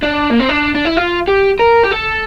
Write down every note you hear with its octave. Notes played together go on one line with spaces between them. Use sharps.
D4
A#3
C4
D4
D4
E4
F4
G4
A#4
G4
A4